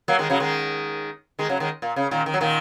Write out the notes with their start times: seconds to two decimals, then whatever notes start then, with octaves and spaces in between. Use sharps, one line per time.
0.08 F#3 A#3
0.19 D#3 G#3
0.30 C#3 F#3
0.40 D#3 G#3
1.39 D#3 G#3
1.49 C#3 F#3
1.60 D#3 G#3
1.82 A#2
1.96 C#3
2.11 A#2 D#3
2.26 D#3
2.34 F#3
2.40 A#2 D#3